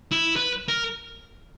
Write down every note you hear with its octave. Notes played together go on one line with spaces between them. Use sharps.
E4
B4
A#4